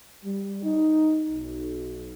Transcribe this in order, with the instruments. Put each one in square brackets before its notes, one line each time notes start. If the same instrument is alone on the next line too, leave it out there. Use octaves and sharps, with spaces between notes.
[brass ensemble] G3
D#4
B1